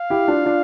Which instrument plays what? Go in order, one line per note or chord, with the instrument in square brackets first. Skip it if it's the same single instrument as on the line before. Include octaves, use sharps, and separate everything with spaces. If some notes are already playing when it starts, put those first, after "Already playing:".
Already playing: [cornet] F5
[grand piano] E4 G4
D4 F4
D4 F4